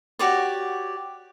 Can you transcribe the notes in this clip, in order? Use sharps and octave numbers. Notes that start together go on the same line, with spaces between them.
F#4 G4 C#5 D5